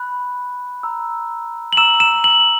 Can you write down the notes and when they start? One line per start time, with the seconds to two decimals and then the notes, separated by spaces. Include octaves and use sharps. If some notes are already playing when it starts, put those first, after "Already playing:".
Already playing: B5 F#6
0.83 A#5 E6
1.73 F#7
1.77 A#5 E6 E7
2.00 E7
2.24 F#7